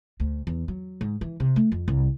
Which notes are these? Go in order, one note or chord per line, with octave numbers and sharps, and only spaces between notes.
D2
E2
F#3
G#2
E3
C3
A3
F2
C2